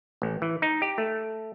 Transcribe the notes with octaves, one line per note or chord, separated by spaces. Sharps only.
A1
E3
D#4
G4
A3